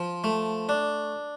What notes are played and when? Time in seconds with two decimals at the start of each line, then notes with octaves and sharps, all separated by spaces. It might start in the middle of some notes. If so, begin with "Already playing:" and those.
Already playing: F3
0.24 A3
0.69 D4